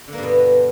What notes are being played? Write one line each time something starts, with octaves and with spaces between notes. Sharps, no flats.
D3
A#3
G2
B2
B3